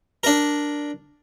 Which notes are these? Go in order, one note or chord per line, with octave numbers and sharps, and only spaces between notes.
D4 A#4